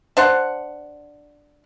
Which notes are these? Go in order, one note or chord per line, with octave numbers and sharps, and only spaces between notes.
D4 C5 F#5